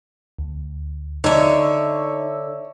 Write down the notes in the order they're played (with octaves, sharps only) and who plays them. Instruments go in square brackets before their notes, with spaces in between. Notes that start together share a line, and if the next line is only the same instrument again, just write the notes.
[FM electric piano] D2
[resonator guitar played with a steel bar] D3 [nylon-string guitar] D#4 [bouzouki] C#5 E5
[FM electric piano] E6